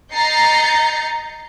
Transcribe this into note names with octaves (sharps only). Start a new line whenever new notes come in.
D#5 A#5 G6 A6 C7 C#7